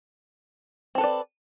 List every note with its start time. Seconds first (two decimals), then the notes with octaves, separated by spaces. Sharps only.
0.95 C4
0.98 A4
1.01 B4
1.04 D5